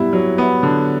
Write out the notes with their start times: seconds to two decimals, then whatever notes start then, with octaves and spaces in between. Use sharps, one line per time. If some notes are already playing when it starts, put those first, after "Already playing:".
Already playing: G3 B3 E4
0.13 F#3
0.38 B3
0.63 D3